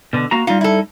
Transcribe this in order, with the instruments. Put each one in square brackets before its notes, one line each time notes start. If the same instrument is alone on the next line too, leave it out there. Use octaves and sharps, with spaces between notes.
[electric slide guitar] B2 D3
A#3 F#4 A#5
[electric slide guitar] G3 D#4 [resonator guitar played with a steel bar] F4
[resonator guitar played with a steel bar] E4 A4